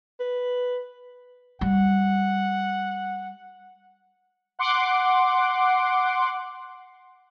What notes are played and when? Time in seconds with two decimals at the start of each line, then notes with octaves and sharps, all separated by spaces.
0.20 B4
1.61 G3 F#5
4.59 F#5 C6 D6